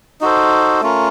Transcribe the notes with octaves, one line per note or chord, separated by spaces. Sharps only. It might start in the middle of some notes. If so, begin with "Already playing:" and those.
D#4 F#4 A4 C5
A3 C#4 F4 A#4